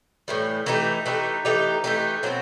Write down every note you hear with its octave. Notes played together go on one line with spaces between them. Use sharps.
A2 E3 G3
E3 A3 D#4 G4
E3 A3 D#4 G4
E3 A3 D#4 G4
E3 A3 D#4 G4
B2 F#3 A3 C4